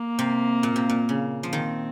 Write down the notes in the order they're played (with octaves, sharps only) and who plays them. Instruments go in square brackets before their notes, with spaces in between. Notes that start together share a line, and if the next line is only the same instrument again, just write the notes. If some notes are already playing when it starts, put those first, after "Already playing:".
Already playing: [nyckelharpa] A#3
[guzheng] C3
A#2
C3
A#2
C#3
F3
[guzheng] D#3 [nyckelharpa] C4